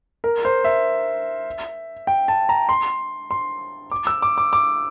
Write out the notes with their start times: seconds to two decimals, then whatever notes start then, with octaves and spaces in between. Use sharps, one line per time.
0.24 A#4
0.45 C5
0.64 E5
2.07 G5
2.28 A5
2.49 A#5
2.69 C6
3.31 C6
3.91 D6
4.07 E6
4.22 D6
4.38 D6
4.53 D6